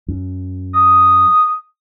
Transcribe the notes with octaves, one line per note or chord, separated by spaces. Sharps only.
F#2
D#6